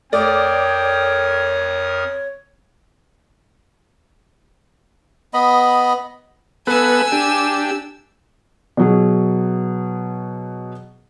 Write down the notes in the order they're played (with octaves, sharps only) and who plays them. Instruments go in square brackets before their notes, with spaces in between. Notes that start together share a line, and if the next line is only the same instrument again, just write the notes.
[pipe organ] F2 A#4 D#6 [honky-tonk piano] A3 D5 [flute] C#5 [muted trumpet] G5
[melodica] B3 D#5 B5
[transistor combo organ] B3 A4 B4 [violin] G#5 E6
[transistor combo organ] D4 G4
[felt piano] B2 F#3 G#4